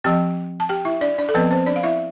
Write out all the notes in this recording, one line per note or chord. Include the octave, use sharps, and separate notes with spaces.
F3 C4 G4 G5
A5
G4 G5
E4 E5
D4 D5
D4 D5
A4
F3 B3 C4 B4
C4 C5
D4 D5
F5
E4 E5